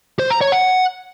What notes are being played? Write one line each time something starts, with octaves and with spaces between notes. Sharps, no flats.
C5
A#5
C#5
F#5